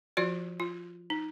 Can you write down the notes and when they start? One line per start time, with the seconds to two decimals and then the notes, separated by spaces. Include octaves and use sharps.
0.17 F3 F4 F#4 D5
0.60 F4
1.10 D#4